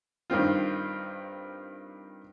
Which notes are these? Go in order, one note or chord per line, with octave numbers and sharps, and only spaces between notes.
G2 D#3 C4 F4